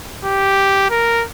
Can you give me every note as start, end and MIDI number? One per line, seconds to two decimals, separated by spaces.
0.25 0.89 67
0.90 1.25 70